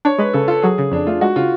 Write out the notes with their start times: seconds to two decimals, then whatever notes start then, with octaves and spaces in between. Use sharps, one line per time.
0.05 D4 C#5
0.19 G#3 B4
0.33 C#3 A4
0.48 F4 A4
0.62 F#3 G#4
0.78 C#3
0.92 F2 D4
1.07 A3 F4
1.21 G#3 F#4
1.36 C#3 F4